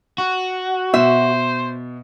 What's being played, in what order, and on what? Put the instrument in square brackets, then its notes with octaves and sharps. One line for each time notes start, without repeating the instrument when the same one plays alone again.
[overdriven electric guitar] F#4
[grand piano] B2 [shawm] C5 [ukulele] E5